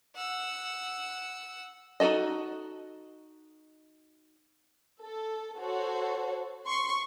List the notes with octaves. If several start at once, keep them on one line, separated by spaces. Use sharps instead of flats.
F#5 E6
D#4 F#4 G#4 A4 D#5
A4
F#4 A4 C5 C#5
C6 C#6